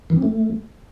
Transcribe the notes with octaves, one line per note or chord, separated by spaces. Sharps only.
E3
C4
A3